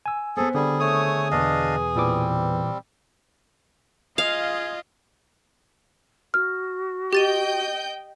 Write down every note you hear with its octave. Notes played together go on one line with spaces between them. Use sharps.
G#5 E6
B3 C4 G#4 A4
D3 G3 G#4
A3 G#4 C#5 D#6
E2 B2 D4 D#5 F5
A#2 E3 G3 C4 D6
F4 G#4 D#5 F5
F#4 F6
G4 D#5 G5 G6 A6 D#7